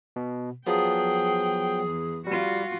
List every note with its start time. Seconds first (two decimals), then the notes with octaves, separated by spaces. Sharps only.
0.16 B2
0.66 F3 F#3 B3 G#4 G5
1.84 E2
2.27 G3 F4 F#4